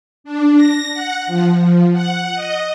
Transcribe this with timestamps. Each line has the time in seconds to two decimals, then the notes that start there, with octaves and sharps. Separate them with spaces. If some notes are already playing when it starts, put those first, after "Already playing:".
0.24 D4
0.56 A#6
0.94 F#5
1.27 F3
1.59 F3
1.93 F#5
2.34 D#5